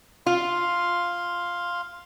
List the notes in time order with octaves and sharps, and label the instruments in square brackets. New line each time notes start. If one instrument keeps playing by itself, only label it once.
[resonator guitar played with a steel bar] F4 [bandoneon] F5 C6